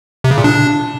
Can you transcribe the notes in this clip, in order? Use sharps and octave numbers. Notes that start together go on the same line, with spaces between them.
C3
C#3
A#2
D4